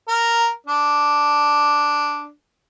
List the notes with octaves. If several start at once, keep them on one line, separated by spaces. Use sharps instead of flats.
A#4
D4